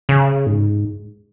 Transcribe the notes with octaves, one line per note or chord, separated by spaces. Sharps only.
C#3
G#2